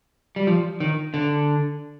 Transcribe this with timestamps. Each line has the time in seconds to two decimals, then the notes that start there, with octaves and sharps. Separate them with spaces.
0.36 G3
0.47 F3
0.80 D#3
1.14 D3